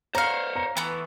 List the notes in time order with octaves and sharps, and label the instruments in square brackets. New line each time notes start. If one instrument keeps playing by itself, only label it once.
[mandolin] F#4 F5 [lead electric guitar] C5 C#5 [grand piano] A#5
[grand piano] A#5
[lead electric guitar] E3 [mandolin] A3 B3